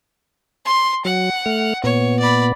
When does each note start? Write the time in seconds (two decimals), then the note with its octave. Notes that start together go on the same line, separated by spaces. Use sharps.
0.65 C6
1.05 F#3 F#5
1.46 A3 F6
1.84 A#2 B3 C#5
2.19 D5 B5